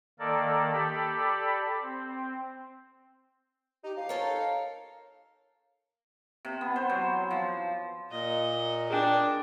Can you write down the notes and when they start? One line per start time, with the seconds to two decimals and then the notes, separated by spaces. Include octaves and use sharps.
0.19 D#3 A#3 A4 A#4 D5
0.73 G4 A4 D5 B5
1.82 C4
3.84 D#4 G4
3.97 F3 F5
4.09 D#4 A4 A#4 C#5
6.45 C3
6.61 B3
6.76 C5
6.90 F#3
7.31 F3
8.11 A#2 D#5
8.90 D4 G#4 G5